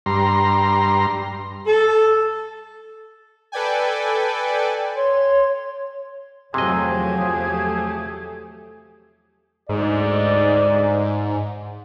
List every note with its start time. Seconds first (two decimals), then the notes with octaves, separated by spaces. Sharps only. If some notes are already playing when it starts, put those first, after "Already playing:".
0.06 G2 A#5 C6
1.66 A4
3.52 A4 B4 D5 G5 G#5
4.96 C#5 C6
6.54 E2 C3 F3 F#3 A3 G4 G#4 D#5
9.69 D2 G#2 D5 D#5